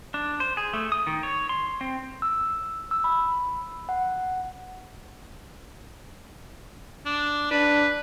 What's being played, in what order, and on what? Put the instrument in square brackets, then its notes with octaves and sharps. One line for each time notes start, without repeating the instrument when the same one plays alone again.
[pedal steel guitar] D4
C5
G#4
A3
D#6
D#3
C#5
C6
C4
[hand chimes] E6
E6
B5
F#5
[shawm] D4
[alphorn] D4 [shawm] B4